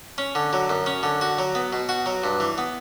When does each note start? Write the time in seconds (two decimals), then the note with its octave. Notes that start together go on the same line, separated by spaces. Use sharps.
0.18 C#4
0.35 D3
0.53 F#3
0.69 F#2
0.86 C#4
1.03 D3
1.21 F#4
1.38 F#3
1.55 B3
1.73 B2
1.89 F#4
2.06 F#3
2.24 G2
2.40 E3
2.58 B3